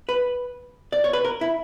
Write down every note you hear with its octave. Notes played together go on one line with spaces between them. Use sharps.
B4
D5
C#5
B4
A#4
E4